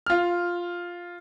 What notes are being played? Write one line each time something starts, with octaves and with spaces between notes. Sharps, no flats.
F4 F6